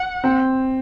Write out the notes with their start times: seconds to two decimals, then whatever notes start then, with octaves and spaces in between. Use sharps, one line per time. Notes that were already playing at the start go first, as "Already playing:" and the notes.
Already playing: F#5
0.24 C4